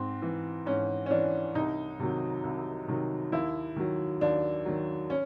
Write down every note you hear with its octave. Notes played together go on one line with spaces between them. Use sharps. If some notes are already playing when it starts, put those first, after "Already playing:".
Already playing: G#2 C4
E3
G#2 C#4
C#4
E3 D4
C2 D#4
C3 D#3 F#3
C2
C3 D#3 F#3
D#2 E4
D#3 F#3
D#2 D4
D#3 F#3
C#4